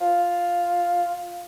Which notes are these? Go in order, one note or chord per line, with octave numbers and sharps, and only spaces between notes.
F4